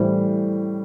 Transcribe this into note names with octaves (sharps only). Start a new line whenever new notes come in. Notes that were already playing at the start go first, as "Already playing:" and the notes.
Already playing: A2 E3 G3 C5